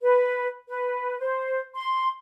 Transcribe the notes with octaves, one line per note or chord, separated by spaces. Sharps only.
B4
B4
C5
C6